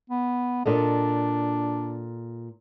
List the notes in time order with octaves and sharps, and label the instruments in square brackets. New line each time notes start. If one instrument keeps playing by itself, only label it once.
[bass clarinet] B3
[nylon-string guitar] A#2 A4 D#5 [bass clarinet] D4